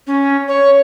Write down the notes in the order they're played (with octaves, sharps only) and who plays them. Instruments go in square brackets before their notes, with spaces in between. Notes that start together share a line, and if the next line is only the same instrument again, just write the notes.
[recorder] C#4
C#5